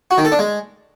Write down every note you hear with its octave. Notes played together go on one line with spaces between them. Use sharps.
F#4
D#3
A4
D4
G#3